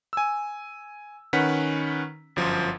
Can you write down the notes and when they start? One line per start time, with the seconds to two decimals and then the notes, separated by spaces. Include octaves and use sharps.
0.13 G#5 E6
1.33 D#3 C#4 B4 F#5 B6
2.36 G1 F#2 F3